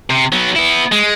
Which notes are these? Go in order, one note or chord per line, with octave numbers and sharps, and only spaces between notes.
C3
F#3 B3
B3 E4
G#3